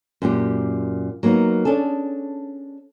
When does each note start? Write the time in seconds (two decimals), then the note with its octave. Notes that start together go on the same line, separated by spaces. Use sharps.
0.22 F#2 A#2 G4
1.23 F#3 A#3 B3 D#4
1.65 C#4 D4 G#4 A4